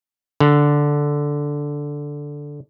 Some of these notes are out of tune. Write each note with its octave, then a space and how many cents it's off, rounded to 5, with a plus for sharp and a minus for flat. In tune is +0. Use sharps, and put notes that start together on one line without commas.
D3 -5